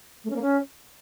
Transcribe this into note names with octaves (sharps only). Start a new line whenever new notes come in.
A3
C#4
A#3
C#4